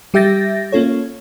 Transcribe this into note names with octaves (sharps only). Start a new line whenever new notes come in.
G3 G4 E5 G6 A6 A#6
A#3 C#4 F4 A4 C#5